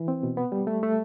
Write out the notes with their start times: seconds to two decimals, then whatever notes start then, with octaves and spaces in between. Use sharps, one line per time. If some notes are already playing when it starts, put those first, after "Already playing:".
Already playing: E3
0.08 C4
0.23 B2
0.37 B3
0.52 G3
0.67 A3
0.83 A3